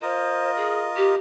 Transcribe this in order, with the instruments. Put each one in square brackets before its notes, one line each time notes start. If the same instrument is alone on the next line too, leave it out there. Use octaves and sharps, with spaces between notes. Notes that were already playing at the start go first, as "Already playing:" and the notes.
[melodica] F4 A#4 D#5 [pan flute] C5
[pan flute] G#4
G4